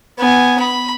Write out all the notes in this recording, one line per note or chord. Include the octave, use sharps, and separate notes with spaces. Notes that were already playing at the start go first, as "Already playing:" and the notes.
B3 G#5
B5